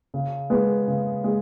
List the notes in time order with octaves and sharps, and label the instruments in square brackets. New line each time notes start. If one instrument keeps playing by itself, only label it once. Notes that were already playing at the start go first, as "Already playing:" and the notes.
[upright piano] C#3
G#3 B3
C#3
G#3